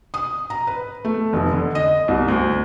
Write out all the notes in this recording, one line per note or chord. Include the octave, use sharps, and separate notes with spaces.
D#6
A#5
B4
A3
F1
D3
D#5
C2
D2